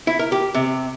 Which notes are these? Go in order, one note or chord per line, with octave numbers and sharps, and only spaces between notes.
E4
A#4
G4
C3